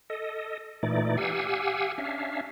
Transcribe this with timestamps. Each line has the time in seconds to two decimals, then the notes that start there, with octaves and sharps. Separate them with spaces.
0.10 A4 D#5
0.83 A#2 E3 A3 D#4 D5
1.17 G4 F5 F#5 G#5 E6
1.98 C#4 D4 E5 F5